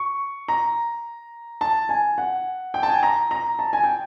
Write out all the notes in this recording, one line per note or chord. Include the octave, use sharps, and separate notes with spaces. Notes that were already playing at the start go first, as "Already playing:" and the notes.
Already playing: C#6
A#5
A5
G#5
F#5
G5
A5
G#5
A#5
A#5
A5
G#5
G5